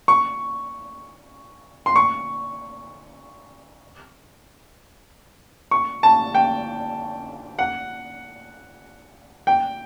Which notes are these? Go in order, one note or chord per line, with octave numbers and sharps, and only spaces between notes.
C#6
C6
C#6
C#6
A5
G5
F#5
G5